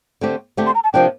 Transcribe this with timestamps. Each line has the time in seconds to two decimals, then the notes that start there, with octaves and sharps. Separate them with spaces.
0.21 D3 A3 C4 G4
0.57 D3 A3 C4 G4
0.66 C6
0.75 A#5
0.84 A5
0.93 C3 F3 A#3 D4 G5